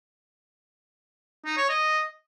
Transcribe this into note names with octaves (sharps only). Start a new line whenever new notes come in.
D#4
C#5
D#5